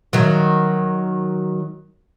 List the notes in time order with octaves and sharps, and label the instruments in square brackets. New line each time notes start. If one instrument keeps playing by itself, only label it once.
[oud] D#3 F#3